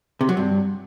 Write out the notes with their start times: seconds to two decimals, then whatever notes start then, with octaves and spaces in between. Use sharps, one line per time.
0.21 C3
0.29 F#3
0.37 G2